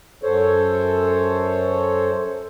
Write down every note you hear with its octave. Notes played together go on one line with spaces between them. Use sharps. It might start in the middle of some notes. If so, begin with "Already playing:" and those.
F#2 A4 C5 C#5